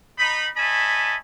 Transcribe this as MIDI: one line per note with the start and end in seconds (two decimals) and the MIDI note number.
0.18 0.48 63
0.18 0.48 83
0.57 1.16 73
0.57 1.16 75
0.57 1.16 76
0.57 1.16 80
0.57 1.16 81
0.57 1.16 83